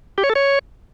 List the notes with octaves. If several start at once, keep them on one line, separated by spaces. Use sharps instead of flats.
G4
C#5
A4
C#5